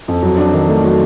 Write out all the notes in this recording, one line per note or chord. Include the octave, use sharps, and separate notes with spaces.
F2
F#3
D4
D#3
A3
F#3